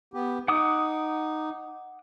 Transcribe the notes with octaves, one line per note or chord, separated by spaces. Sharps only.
B3 G4
D#4 F#5 D6 D#6